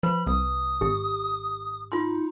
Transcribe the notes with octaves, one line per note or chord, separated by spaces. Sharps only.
F3 B4 B5
C2 D#6
G#1 G4
D#4 F4 C6